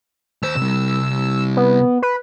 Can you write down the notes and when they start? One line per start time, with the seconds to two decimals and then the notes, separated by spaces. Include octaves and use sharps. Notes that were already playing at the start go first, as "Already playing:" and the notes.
0.43 D#2 C5 E6
0.57 C3 G3
1.57 B3
2.03 B4